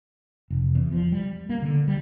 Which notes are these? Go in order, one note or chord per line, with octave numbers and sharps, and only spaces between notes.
F1
E2
F3
G3
A#3
D3
G3